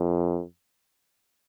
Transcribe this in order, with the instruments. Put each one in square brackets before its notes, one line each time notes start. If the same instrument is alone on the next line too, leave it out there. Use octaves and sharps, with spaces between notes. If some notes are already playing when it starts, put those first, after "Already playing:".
Already playing: [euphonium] F2